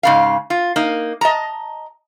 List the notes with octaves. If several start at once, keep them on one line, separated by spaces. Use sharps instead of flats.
G#2 C#3 F5
F4
A#3 D#4
D#5 A5 A#5